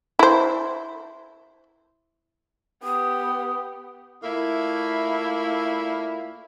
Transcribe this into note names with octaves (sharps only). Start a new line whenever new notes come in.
E4 C5
B3 G4 D#6
A#2 A3 A#3 E4